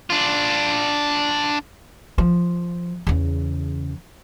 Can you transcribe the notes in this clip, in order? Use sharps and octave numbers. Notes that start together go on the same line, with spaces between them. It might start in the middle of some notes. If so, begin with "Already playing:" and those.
D4 F4
F3
E2 C#3